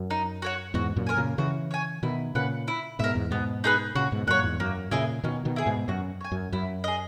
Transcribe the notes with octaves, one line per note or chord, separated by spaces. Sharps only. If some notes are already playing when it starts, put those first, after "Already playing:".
Already playing: F#2
D#4
F#4 C#5 F#5
E2 G#2 F#4
F#2 A#2
A#4 C#5 G#5
A#2 C#3
C#3 E3 F#4
C#5 G#5
B2 D#3 E4
A#2 C#3 B4 F#5
E4
G#2 B2 A#4 E5
E2 G#2
G#2 B2 B3
D#4 G#4 B4
A#2 C#3 F#4
G#2 B2
F#2 A#2 C#5 F#5
E2 G#2
F#2 A#3
A#2 C#3 E4 G#4 D#5
B2 D#3 C#4
B2 D#3
E4 G#4
G#2 B2
F#2 F#4
C#5 G#5
F#2
F#2 E4
G#4 D#5